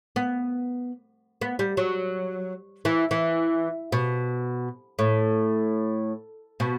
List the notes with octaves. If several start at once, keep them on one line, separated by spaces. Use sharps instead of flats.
B3
B3
G3
F#3
E3
E3
B2
A2
B2